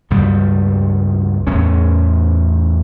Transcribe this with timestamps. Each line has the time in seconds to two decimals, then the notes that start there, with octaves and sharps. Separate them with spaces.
0.10 C#2 G2 B2 G3
1.47 E2 A2 C#4